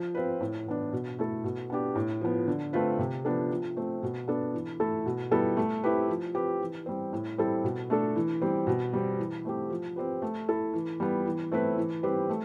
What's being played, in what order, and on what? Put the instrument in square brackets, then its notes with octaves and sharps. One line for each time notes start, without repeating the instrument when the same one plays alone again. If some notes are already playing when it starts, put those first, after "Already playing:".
Already playing: [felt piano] F3
C4 F4 B4
A2
E3 B3 D4
B2
A3 E4 A4
B2
B3 D4 G4
A2
F3 B3
D3
A3 C4 F4 B4
C3
F3 B3 D4 A4
F3
A3 C4
B2
B3 D4 A4
E3
A3 E4 A4
B2
G3 B3 E4 A4
A3
C4 E4 G4 B4
F3
C4 G4 B4
E3
G3 C4
A2
G3 C4 E4 A4
B2
A3 D4 A4
E3
G3 C4
B2
G3 C4
E3
A3 C4 G4
F3
C4 G4 B4
A3
E4 A4
E3
G3 B3
E3
A3 C4 E4 B4
E3
G3 C4 G4 B4
A3